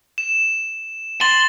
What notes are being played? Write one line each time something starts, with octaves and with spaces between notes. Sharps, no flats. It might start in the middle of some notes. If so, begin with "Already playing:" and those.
E7
C6 A6 F#7